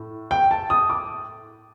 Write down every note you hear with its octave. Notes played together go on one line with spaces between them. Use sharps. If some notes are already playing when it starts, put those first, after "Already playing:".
Already playing: A2
G5
A5
D#6
D6